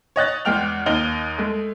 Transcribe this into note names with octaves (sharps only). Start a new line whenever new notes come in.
C#5 D#5 F#6 A6
E2 G#3 G5 F6 F7
D#2 D#4 G7
G#3 A3